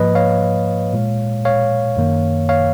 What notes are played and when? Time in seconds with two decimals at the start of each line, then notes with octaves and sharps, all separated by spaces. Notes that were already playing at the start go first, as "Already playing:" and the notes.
Already playing: G#2 F3 A#3 B4 D#5
0.15 C#5 F5
0.93 A#2 G#3
1.45 C#5 F5
1.97 F#2 D#3 A#3
2.49 C#5 F5